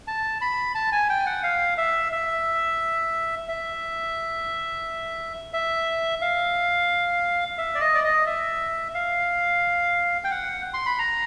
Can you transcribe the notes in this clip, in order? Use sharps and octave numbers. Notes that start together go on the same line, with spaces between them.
A5
B5
A5
G#5
G5
F#5
F5
E5
E5
E5
E5
F5
E5
D5
D#5
D5
D#5
E5
F5
G5
F#5
C6
B5
A#5